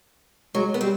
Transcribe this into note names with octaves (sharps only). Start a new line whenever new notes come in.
F#3 G#3
B3
G3 C4